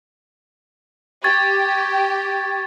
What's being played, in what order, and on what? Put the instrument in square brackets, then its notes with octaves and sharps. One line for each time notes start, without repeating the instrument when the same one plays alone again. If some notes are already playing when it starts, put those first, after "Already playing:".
[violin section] G4 [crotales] C#6 G#6 A6